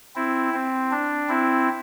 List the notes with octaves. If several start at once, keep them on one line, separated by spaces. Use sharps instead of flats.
C4 E4
C4
D4
C4 E4